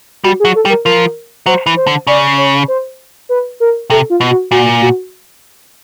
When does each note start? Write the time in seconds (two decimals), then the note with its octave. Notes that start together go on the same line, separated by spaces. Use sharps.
0.24 G3 F#4
0.40 G#4
0.45 F#3
0.55 A4
0.65 G3
0.70 A#4
0.85 F3 A#4
1.46 F#3 C5
1.66 E3
1.76 C5
1.87 D3
2.07 C#3 D5
2.37 C#5
2.68 C5
3.29 B4
3.60 A#4
3.90 C3 A4
4.10 F4
4.21 B2
4.30 F#4
4.51 A#2 F#4
4.82 F#4